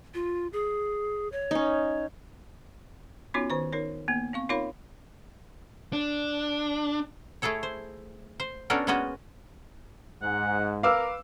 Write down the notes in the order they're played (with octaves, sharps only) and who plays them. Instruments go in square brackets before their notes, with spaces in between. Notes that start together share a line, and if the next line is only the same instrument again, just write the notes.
[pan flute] F4
G#4
C#5
[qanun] C#4 D#4
[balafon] B3 C#4 D#4 F4 F#4 C#5
D#3 C5 C#6
D#4 A#4 C#5
A#3 B3
C4 F5 C#6
D#4 F4 A#4 C#5 F5 B5
[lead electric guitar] D4
[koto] A3 E4 G#4 A4 C#5
C5
C5
B3 C#4 D4 F#4 A4 A#4
G#3 A#3 B3 C#4 F#4 D#5
[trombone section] G#2 [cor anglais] F#5
[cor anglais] A#4 [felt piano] B4 D6 E6 [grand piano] F5